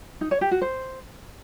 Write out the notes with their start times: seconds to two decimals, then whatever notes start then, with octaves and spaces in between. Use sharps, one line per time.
0.21 D#4
0.31 C#5
0.41 G4
0.51 F#4
0.62 C5